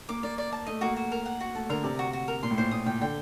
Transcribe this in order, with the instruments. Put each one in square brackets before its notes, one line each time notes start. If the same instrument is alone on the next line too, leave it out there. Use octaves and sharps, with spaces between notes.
[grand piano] A#3 [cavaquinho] D6
[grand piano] A#3 [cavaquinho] D5
[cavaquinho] D5
A5
[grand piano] A3 [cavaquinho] D#5
[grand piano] A#3 [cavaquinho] F#4
[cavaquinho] F#4
A#4
F#5
F#4
[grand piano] A3 [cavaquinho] A5
[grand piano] D3 [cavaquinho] A#4
[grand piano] C3 [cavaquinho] D5
[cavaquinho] F#4
F#4
A#4
[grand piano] A#2 [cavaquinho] C6
[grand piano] A2
[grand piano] A#2 [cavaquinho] C5
[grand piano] A#2 [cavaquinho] D#6
[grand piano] A#2 [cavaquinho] G5
[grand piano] D3 [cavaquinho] G5